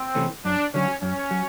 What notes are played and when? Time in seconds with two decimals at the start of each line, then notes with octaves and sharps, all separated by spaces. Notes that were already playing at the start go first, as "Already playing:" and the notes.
Already playing: C4
0.15 C3 E3 A3 C#4
0.45 F#2 D4
0.74 D3 F#3 C#4
1.02 F#2 C#4
1.31 F#3